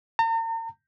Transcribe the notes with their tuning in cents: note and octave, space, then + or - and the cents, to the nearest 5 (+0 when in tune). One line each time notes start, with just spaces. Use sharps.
A#5 -45